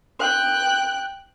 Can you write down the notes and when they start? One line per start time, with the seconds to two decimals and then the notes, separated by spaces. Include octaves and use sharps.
0.20 G5 F#6